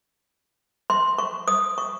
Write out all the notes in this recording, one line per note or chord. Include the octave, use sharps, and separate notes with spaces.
C6
C#6
D#6
C#6